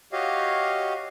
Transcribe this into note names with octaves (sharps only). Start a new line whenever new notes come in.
F#4 G4 C#5 D#5 F5